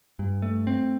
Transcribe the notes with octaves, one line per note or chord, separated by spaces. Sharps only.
G2
A3
C4